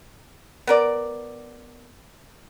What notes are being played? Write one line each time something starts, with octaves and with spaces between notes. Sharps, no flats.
B3 A#4 D5